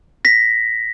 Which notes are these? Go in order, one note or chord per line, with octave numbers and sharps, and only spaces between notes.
A#6 B6